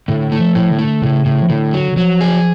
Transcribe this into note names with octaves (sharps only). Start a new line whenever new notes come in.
A2 D3
A3
F3
A2
D3
A3
A2 C#3
A2
F3
A2 D3
F#3
D3
F3 F#3
G#4